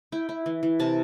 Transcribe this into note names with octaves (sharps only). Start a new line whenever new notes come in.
E4 G5
E4
E3
E3
C3 A5